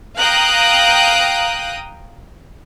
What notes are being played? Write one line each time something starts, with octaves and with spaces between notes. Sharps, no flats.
F5 G5 A#5 D#6 F#6